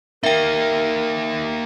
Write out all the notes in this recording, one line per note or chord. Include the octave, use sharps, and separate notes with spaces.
A#3 D#4 A#4 E5 G5